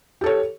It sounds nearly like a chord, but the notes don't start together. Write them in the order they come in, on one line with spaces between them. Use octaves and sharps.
G4 A4 C#5